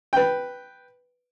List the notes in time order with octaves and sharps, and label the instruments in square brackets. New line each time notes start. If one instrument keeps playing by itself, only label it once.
[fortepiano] B4 G5